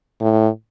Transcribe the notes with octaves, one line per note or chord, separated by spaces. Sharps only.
A2